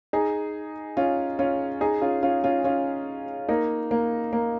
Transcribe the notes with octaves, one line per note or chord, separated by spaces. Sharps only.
D#4 G#4
C#4 F4
C#4 F4
D#4 G#4
C#4 F4
C#4 F4
C#4 F4
C#4 F4
A#3 D#4
A#3
A#3